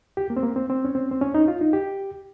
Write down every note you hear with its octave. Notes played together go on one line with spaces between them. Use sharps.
G4
A#3
C4
A#3
C4
C4
C#4
C4
C4
C#4
D#4
F4
D#4
G4